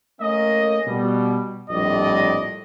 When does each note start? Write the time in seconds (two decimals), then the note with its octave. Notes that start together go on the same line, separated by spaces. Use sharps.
0.21 A3 A#3 C#4 A#4 D#5
0.87 B2 G3
1.70 A#1 F2 A2 G3 D5 D#5